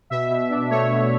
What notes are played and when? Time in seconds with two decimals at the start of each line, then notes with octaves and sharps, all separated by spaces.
0.10 B2 E5
0.30 B2
0.50 D4
0.70 A3 C#5
0.91 B2